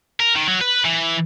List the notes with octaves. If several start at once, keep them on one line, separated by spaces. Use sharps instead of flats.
A#4
D#3
F#3
B4
E3